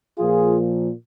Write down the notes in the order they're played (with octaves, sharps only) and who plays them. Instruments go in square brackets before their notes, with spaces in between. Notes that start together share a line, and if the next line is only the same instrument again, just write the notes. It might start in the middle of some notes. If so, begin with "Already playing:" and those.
[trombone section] A#2 F3 A#3 F4 G#4